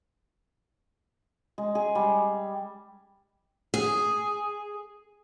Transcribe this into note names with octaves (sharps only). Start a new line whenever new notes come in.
G#3
G#4
G3
G#4